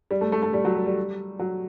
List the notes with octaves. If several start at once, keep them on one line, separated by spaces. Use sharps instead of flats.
G3
A3
A3
A3
G3
F#3
G3
G3
F#3